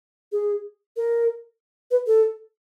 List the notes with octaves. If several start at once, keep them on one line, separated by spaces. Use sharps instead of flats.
G#4
A#4
B4
A4